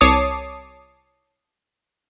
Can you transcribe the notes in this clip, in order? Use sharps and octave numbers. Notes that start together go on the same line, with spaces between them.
C2 C#5 A5 D6 D#6 C7